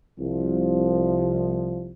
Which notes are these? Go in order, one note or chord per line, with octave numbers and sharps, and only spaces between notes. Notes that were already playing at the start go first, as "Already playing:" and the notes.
C2 F3